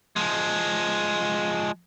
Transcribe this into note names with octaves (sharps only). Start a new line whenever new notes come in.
F3 G#3